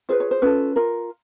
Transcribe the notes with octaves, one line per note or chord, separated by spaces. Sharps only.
F4 G#4 B4 C5
C#5
C5
C#4 F4 A4 B4
F4 A#4